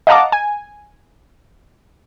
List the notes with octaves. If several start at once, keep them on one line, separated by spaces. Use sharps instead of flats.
D#5 F5 F#5 A5 A#5 D6
G#5